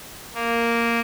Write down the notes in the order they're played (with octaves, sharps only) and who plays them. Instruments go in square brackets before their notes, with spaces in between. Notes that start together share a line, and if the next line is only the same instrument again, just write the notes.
[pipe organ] A#3